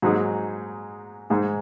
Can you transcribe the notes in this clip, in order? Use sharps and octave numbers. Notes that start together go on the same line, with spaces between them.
G#2 F#3 D#4 G#4
G#2 G#3 D#4 G#4